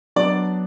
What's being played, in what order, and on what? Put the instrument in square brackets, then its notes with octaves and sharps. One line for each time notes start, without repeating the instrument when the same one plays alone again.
[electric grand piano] F#3 B3 D4 [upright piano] D5